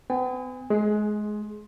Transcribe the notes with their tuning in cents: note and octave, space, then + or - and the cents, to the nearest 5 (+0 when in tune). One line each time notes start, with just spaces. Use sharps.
B3 +40 G#5 -30
G#3 +25 G#4 +5